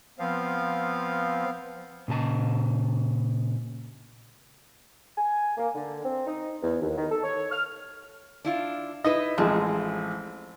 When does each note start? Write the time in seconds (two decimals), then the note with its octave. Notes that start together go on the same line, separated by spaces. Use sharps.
0.19 F3 B3 C4 F5
2.08 A#2 C#3 A#4 A5
5.18 G#5
5.58 A#3
5.75 D3
6.05 C4
6.27 D#4
6.62 E2
6.82 D#2
6.97 D#3
7.11 A4
7.24 C#5
7.52 F6
8.45 D4 E4 F4
9.04 D#4 E4 B4 D#5
9.38 A1 F3 G#3 C4